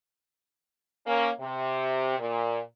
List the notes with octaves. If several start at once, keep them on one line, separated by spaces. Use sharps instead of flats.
A#3 C#4
C3
A#2